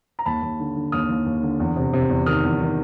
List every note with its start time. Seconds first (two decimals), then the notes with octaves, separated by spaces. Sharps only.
0.19 A#5
0.26 D#2 A5 B5
0.42 D#2
0.60 D3
0.76 D3
0.92 D#2 D#6 F6
1.09 D#2
1.26 D#2
1.43 D3
1.60 E2
1.76 C3
1.93 C3
2.10 E2
2.26 D#3 D#6 F6
2.43 E2
2.60 D#3